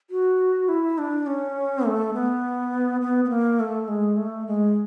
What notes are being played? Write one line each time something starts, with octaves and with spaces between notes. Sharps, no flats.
F#4
E4
D4
C#4
A3
B3
B3
B3
A#3
A3
G#3
A3
G#3